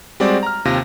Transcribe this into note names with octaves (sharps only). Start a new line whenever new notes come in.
G3 G#3 C4 F#4 D5
A#5 F6
D#2 C3 F4 A#6